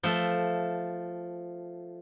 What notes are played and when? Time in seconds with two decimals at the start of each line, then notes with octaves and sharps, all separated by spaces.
0.03 F3 A3 E5